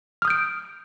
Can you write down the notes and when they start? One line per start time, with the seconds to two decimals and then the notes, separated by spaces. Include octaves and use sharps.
0.22 F6
0.25 D#6
0.28 G6
0.30 D7